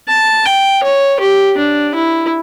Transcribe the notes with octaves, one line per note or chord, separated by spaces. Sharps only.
A5
G5
C#5
G4
D4
E4